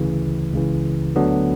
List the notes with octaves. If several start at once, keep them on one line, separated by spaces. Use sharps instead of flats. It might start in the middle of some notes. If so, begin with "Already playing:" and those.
Already playing: D2 C#3 E3
C#2 C#3 E3
D2 D3 F#3 B3 D4